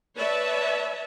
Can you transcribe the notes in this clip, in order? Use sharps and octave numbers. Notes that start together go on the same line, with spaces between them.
B4 C#5 D5 E5 A5